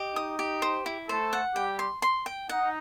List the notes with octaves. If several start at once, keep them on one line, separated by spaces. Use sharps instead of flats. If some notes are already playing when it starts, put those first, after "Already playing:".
Already playing: G4 D#5
D#4 D#6
G4
C5
E4
A3 A4 C5
F#5
G3 G4 G5
C6
C6
G5
D#4 F#5